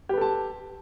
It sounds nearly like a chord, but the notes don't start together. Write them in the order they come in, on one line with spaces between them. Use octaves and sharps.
G4 B4 A4 A5